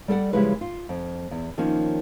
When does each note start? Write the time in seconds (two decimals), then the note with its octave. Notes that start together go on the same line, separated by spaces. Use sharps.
0.08 G3 A4 D5 F#5
0.33 C#3 F3 G3 G#3 E4 B4
0.61 F4
0.89 F2
1.31 E2
1.58 D#3 F3 A#3 C#4